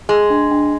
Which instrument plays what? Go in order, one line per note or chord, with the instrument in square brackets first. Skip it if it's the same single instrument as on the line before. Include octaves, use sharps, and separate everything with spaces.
[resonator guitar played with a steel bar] G#3 [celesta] G#4
[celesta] D4
D4